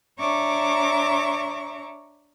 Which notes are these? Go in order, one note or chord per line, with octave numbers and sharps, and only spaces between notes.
D4 C#5 E5 A#5 C#6 D6